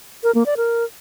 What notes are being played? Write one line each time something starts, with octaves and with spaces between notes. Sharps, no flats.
A#4
A#3
D5
A#4